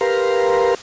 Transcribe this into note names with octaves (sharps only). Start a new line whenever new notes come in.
G4 A#4 B4 F5 A#5 C6